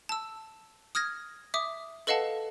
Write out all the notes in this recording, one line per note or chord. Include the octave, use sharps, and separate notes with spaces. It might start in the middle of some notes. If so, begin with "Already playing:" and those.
A5 E6
D#6 F6 G#6 A#6
E5 D6 D#6
A4 B4 D#5 F5 F#5 A5